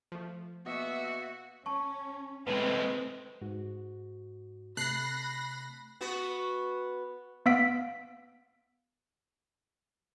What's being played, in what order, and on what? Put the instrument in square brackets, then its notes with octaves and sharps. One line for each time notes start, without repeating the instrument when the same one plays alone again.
[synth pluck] F3 A3
[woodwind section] B2 A#3 B3 [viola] F#4 [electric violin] E5
[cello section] C#4 [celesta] A5 C#6
[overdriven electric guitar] A2 G#3 [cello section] C4 [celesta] B4 B5
[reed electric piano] G#2 F#4
[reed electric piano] C3 A3 A5 [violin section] B5 A#6 [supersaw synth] F#6 C7
[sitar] B3 F#4
[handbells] B3 F5 E6 B6 D7